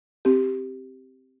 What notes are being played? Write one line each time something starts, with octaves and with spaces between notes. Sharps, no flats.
C4 G4